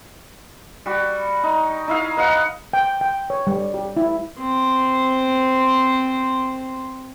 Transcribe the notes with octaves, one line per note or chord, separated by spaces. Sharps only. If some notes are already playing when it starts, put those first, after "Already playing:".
G3 F#4
D#4
D#4 E4 F5
B4 D#5 F5 F#5
G5
G5
C#5
G3
G4
E4
C4 C5